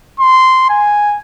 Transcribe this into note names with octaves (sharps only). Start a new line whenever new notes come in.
C6
G#5